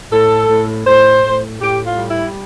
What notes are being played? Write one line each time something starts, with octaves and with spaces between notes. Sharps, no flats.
A2 A4
A2
A2 C5
A2
A2 G4
F4
G3
E4